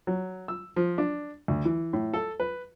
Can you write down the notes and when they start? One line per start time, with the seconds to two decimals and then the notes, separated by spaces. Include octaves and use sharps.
0.07 F#3
0.48 E6
0.76 F3
0.98 D4
1.48 D2
1.65 E3
1.93 A2
2.14 A4
2.40 B4